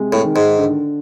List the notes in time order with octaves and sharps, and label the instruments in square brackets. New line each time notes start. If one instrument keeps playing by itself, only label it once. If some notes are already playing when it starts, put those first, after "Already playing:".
Already playing: [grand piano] C3 G#3
[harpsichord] A2
[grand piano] D#3
[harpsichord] G#2
[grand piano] D3